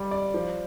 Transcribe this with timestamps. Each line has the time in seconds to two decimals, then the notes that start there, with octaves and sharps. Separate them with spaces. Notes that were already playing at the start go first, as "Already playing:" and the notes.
Already playing: G3 D5
0.11 D5
0.34 F3